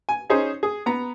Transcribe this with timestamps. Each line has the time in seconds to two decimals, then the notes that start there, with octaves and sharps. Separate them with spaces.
0.09 G#5
0.30 C#4 D#4 G#4 C5
0.63 G#4
0.86 B3 A#5